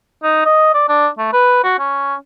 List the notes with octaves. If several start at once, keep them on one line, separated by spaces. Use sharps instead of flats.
D#4
D#5
D5
D4
A3
B4
F#4
C#4